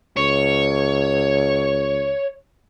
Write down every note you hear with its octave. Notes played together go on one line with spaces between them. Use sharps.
C#2 C#5